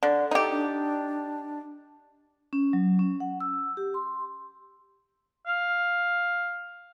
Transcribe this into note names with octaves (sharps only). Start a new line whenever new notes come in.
D3
D#4 G4 A4
D4
C#4
F#3
C#4
F#5
E6
G4
C6
F5